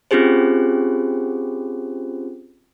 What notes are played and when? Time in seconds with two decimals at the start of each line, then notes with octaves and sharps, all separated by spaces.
0.11 C4 C#4 F4 G4 G#4 C5